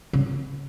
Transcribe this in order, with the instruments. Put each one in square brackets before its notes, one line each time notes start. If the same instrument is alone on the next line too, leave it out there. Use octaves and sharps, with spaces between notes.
[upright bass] C#3